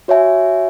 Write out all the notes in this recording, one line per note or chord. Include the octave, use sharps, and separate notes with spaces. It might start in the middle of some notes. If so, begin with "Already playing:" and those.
F#4 C#5 E5 G#5